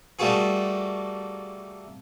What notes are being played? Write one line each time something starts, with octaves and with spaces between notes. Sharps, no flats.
G3 A3 A#3 F#4 G#4